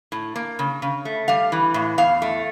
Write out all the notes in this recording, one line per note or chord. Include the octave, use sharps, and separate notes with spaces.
A2
A#3
C#3
C#3
A3
G3 F5
E3
A2
E2 F5
A3